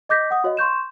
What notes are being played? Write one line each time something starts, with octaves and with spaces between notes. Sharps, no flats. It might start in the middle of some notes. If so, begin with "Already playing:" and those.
D#5 D6 G6 A#6 B6
F#5 D#6
F#4 C#5 D#5 F5
C6 C#6 G6 E7